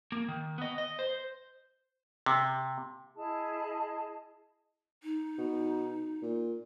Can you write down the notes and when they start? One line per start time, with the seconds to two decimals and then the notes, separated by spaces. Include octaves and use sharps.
0.12 A#3
0.28 D#3
0.58 B3 D#5
0.78 D#5
0.99 C5
2.26 C3
3.17 E4 G#4 D#5 A5
5.03 D#4
5.38 B2
6.22 A#2